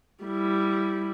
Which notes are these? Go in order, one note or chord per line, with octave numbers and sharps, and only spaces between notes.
G3 E4